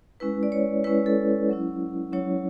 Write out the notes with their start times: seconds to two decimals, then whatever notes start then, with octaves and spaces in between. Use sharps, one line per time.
0.20 G#3 C#4 E4 B4
0.43 D5
0.52 C#5
0.84 G#3 C#4 E4 B4
1.06 A4
1.49 F#3 C#4 E4
2.12 F#3 C#4 E4 C#5